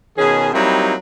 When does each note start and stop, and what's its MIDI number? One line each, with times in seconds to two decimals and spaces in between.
0.18 0.49 47
0.18 0.49 51
0.18 0.49 61
0.18 0.49 68
0.53 0.94 54
0.53 0.94 55
0.53 0.94 58
0.53 0.94 60
0.53 0.94 63
0.53 0.94 64